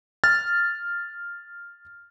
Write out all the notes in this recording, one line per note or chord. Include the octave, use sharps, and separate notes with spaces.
F6 A6